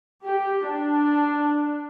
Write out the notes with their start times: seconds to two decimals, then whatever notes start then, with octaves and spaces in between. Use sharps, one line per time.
0.24 G4
0.66 D4